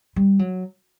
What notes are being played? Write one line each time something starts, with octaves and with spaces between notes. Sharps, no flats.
G3
F#3